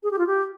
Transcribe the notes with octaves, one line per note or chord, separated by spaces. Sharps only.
G#4
G4
F4
G4